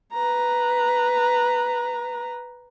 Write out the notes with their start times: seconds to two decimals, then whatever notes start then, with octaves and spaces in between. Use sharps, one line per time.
0.13 B4 A#5